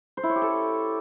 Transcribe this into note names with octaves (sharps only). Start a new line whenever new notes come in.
C5
E4
C#5
G4
A4